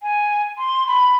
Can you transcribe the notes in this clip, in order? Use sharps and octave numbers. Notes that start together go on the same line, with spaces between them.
G#5
C6
B5